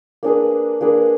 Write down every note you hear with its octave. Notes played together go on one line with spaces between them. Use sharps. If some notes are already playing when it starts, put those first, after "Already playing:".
A#3 D4 G#4 B4
A#3 D4 G#4 B4